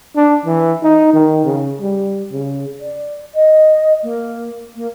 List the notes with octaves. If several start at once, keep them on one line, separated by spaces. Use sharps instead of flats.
D4
E3
D#4
D#3
C#3
G3
C#3
D5
D#5
A#3
A#3